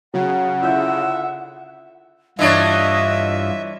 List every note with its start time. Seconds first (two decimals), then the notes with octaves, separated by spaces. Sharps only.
0.14 C#3 F#3 F#5
0.62 D3 E4 F4 E5 G6
2.39 G2 E3 D4 F4 C#5 D#5 E5